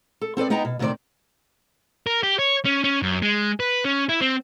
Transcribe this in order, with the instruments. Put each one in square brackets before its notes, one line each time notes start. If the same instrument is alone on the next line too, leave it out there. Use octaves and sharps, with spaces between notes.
[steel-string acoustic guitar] A4
C4 A4 B4 D5
B3 D#4 D#5 G5 A#5
B2
D2 C3 D#3 F4 C5 D5
[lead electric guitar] A#4
G4
C#5
C#4
C#4
F#2
G#3
B4
C#4
E4
C4